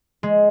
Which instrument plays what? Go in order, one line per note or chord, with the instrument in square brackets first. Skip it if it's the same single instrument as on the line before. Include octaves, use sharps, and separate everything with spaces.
[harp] G#3